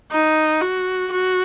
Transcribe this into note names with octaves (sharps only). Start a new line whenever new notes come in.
D#4
F#4
F#4